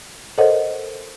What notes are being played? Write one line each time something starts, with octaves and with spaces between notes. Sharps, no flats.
A4 A#4 C5 C#5 D#5 F#5